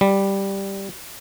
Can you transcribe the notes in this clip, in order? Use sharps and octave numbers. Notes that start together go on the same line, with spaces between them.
G3